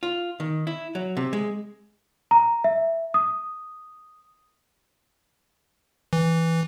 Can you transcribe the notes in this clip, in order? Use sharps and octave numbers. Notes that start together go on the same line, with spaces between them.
F4
D#3
E4
F#3
C3
G#3
A#5
E5
D#6
E3